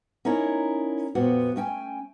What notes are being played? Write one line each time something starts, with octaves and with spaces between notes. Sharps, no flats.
C#4 D#4 E4 A#4 C#5 D5
F2 A#2 B3 F#4
A3 C#4 G5 G#5